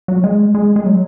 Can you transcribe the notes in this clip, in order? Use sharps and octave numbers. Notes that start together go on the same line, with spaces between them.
F#3
G#3
G#3
G#3
F#3